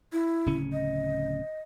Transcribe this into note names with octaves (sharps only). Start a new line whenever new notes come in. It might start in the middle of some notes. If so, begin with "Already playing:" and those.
E4
D1 C#3 C#4
D#5